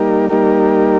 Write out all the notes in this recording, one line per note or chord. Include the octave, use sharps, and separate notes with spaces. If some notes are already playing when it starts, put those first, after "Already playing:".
Already playing: G3 A#3 D#4 G4 A#4
G3 A#3 D#4 G4 A#4